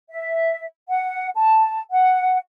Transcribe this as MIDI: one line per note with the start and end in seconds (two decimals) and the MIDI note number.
0.09 0.64 76
0.89 1.29 78
1.35 1.80 81
1.91 2.37 78